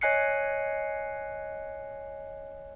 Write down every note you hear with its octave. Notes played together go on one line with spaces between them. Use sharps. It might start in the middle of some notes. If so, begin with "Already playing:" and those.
C#5 D#5 G#5 F#6 C7 C#7